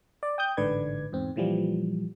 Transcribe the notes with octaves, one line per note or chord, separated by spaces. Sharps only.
D5
G5 D#6 G6
A1 G#2 D3 B4 D5 G#6
E2 G#2 C4
A#2 E3 F3 G3